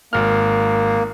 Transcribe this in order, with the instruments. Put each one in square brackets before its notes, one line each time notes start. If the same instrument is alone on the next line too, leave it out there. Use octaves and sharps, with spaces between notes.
[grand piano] G#1 F6 [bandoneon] A#3